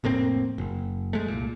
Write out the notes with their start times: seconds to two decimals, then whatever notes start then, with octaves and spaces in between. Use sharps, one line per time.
0.04 F1 A2 A#3 C4
0.58 F#1
1.13 G#3 A3
1.28 C2 A#2